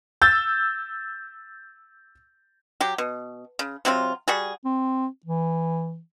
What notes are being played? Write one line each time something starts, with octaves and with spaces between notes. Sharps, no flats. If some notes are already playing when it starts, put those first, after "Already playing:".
E6 G6 A6
F#3 G4
B2
C#3
C3 F#3 C4 F4
G3 F#4 G#4
C4
E3